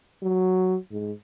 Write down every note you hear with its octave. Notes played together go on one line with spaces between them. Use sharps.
F#3
G#2